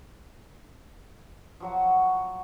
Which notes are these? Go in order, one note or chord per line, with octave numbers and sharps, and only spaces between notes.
F3 F#3 F#4